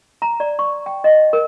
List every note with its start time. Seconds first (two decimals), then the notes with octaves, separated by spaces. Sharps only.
0.22 A#5
0.40 D5
0.59 C#6
0.86 G5
1.04 D#5
1.33 A#4